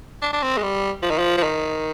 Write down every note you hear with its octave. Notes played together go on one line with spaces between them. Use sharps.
D4
D4
C4
G#3
G3
F3
D#3
F3
F3
D#3